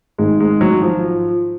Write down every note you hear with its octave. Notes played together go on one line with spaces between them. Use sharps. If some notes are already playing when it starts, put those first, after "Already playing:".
G#1 G#2 D#3 G#3
G#3
F#3
F3